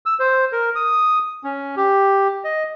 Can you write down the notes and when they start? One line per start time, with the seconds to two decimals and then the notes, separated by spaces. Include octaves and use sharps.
0.06 E6
0.20 C5
0.52 A#4
0.75 D#6
1.44 C#4
1.77 G4
2.44 D#5